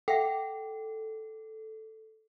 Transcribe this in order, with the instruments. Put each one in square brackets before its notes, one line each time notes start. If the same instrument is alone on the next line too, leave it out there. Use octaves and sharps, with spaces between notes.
[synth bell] A4 [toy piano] E5 F#5 G5